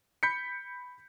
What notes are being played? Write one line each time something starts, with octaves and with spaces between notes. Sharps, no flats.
B5 G6 B6 C#7